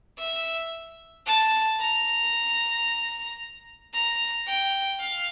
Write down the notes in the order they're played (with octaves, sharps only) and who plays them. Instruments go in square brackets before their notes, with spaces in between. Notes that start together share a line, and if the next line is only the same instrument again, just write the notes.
[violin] E5
A5
A#5
A#5
G5
F5